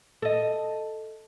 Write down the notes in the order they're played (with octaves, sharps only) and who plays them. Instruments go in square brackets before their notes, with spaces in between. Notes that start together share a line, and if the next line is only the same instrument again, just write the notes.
[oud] A4 D#5